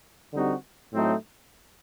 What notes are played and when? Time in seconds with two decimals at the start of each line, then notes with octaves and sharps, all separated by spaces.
0.34 D3 G3 C4 D#4 F#4
0.93 A2 F#3 A3 C4 D#4